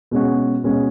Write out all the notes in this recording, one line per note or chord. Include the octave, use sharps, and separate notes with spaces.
B2 G#3 C#4 F#4
B2 G#3 C#4 F#4